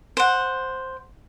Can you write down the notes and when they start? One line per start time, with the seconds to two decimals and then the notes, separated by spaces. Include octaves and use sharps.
0.17 C5 F#5